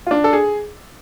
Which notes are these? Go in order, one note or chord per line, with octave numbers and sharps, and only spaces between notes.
F4
D4
A4
G#4